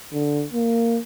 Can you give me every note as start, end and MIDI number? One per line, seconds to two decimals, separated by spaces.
0.13 0.44 50
0.53 0.99 58